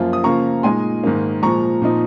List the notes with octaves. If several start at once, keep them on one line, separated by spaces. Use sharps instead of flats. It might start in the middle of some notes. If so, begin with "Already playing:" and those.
Already playing: F#2 F3 A#3 F4
D#6
C#3 F3 A#3 F4 A#5 C#6
A#2 G#3 D#4 G#5 C6
G#2 D#3 A#3
A#2 F3 G#3 A#5 C#6
A#2 F3 C4 D#4